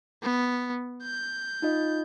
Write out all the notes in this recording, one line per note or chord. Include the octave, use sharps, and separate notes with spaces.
B3
G6
D#4 F4 D#5